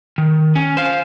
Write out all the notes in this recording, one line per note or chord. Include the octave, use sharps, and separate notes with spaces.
D#3
C#4
C5 F5